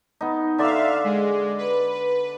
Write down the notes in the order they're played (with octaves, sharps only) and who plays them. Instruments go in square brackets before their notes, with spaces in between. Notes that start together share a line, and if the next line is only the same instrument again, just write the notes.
[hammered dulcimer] B3 D#4
[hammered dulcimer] D3 D5 C6 [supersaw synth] E5 F5
[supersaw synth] G#3
B4